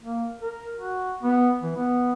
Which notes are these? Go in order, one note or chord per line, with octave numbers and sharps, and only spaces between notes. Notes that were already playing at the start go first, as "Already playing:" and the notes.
A#3
A#4
F#4
B3
E3
B3